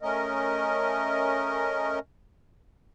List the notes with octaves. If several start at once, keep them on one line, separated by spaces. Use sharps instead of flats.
A3 C#4 A#4 D#5